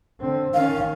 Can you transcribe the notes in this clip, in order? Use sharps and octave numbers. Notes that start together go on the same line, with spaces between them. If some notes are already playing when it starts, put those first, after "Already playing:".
D3 C4
D#3 C#4 F5